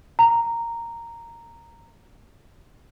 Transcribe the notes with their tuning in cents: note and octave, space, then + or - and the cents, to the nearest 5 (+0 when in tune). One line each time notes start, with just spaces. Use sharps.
A#5 -5